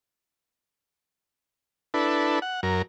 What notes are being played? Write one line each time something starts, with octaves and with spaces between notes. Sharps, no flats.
D4 E4 A4 B4
F#5
F#2 A#4